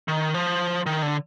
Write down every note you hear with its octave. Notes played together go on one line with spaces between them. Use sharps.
D#3
F3
D#3
D3